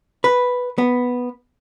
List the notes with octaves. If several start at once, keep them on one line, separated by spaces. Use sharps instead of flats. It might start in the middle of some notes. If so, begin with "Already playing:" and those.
B4
B3